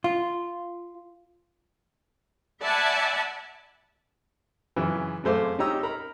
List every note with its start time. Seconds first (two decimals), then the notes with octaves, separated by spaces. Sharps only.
0.04 F4
2.62 D5 E5 F#5 G#5 A5 B5
4.76 F#2 C#3 E3
5.23 F#2 G#3 A3 C5 F5 D6
5.58 C#4 D#4 G4 A#5 E6
5.83 A#4 A#5 B5